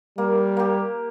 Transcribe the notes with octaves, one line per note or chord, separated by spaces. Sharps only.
G3 A#3
A#3 G4